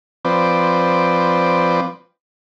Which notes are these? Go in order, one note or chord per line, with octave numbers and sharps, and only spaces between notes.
F3 C4 B4 D5